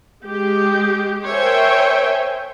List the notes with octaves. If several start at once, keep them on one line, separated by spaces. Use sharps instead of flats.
G#3 G4
A#4 C5 C#5 E5 G5 G#5